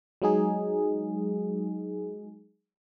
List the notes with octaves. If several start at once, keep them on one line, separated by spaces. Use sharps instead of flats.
F#3 G#3 D#4 G#4